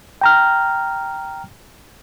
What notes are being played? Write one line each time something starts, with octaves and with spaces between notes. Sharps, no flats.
G5 A#5 F6